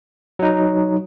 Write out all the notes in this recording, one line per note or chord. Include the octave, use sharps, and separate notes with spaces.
F#3 D#4